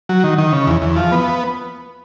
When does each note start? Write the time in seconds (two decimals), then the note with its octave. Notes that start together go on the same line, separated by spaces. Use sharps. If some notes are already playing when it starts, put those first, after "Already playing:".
0.09 F#3
0.24 D#3
0.38 D#3
0.53 C#3
0.67 E2
0.82 E2
0.96 F3
1.12 B3